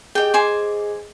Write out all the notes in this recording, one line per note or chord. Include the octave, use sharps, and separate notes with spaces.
G4 G#4 D#5 G5
C5 G#5 D6